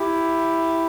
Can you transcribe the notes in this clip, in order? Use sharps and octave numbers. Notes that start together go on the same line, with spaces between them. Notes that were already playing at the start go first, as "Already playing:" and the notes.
Already playing: E4 G4